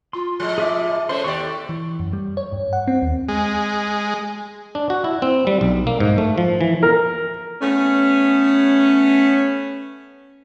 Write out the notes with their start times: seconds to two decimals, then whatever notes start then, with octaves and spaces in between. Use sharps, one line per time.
0.13 F4 C6
0.39 A2 F3 G#3
0.58 G#4 E5 D6
1.09 A3 C#4 A4 C5 C6
1.24 D#2 G4 D5 G5 C#6
1.69 E3
2.00 F#2
2.13 G3
2.37 C#5
2.52 G2
2.73 F#5
2.88 C4
3.02 D#2
3.28 G#3
4.75 D4
4.90 F#4
5.04 E4
5.22 C4
5.47 G3
5.61 B1
5.87 A#3
6.00 G#2
6.18 A3
6.38 F3
6.61 E3
6.83 A#4
7.62 A3 B3 C#4